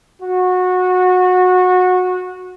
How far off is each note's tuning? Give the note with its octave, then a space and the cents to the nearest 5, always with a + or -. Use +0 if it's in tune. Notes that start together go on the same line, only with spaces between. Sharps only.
F#4 -20